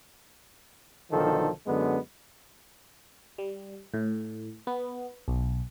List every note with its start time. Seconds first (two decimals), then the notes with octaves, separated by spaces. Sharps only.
1.12 B1 D3 D#3 F3 A4
1.67 F#2 D3 G#3 B3
3.38 G3
3.94 A2
4.67 B3
5.28 B1